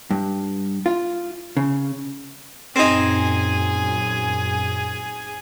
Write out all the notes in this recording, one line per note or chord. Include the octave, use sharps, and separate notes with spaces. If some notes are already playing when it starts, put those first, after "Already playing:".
G2
F4
C#3
F#2 A#2 C4 D#4 G#4 G#5